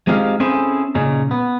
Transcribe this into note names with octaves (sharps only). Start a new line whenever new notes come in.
G#3 C4 D#4 F4 G4 F5
C4 C#4 E4 G#4 A4 C5
A#2 C#3 C#4 D#4
B3